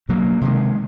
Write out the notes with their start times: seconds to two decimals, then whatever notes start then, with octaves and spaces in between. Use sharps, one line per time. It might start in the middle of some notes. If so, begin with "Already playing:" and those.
0.09 B2 F#3 A#3
0.41 C3 D#3 G#3